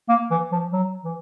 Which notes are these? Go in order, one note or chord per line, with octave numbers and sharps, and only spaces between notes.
A#3
E3
F3
F#3
E3